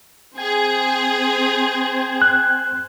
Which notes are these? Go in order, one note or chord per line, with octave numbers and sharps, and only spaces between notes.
C4 G#4 C5 G5 G#5 G#6
F#6